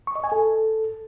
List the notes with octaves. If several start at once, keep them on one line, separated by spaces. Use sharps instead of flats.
C#6
D#5
G#5
A4